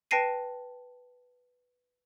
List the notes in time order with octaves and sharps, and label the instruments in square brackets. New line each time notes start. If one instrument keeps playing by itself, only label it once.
[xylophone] B4 G5 A5 A#6 C7 D#7